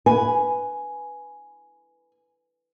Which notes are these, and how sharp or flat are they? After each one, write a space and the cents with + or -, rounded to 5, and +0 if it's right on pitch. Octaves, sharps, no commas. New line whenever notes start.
B4 +0 G#5 +5